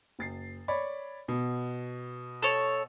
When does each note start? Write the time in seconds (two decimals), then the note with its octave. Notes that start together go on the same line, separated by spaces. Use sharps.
0.19 F#1 A6 C7
0.68 C#5 D5 B5
1.28 B2
2.42 A4 C#5